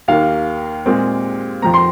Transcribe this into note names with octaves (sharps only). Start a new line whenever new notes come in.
D#2 D#3 A#3 F5
A#2 G#3 C4
F2 F3 C4 A#5
C6